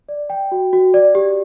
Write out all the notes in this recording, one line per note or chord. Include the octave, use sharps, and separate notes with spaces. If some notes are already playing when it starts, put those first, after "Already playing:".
D5
G5
F#4
F#4
D5
G4